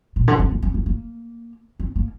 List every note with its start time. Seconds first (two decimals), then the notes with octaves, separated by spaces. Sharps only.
0.16 A#2
0.28 D3
0.39 C4
0.51 A#3
0.62 C4
0.74 A#3
0.86 A#3
1.80 C4
1.96 A#3